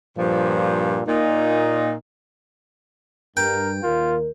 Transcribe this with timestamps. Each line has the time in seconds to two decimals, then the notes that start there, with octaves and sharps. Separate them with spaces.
0.18 G2 A#2 F3
1.08 A#2 D#4
3.37 G2 A#4 G5
3.83 D#2 F4 A#4